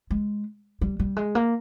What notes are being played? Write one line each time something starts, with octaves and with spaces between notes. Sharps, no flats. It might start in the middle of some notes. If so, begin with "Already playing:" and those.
G#3
G3
G3
G#3
A#3